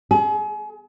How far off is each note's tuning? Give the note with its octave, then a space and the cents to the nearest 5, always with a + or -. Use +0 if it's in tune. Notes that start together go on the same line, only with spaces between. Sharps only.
G#4 +35